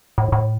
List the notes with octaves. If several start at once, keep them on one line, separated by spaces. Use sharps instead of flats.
A2
A2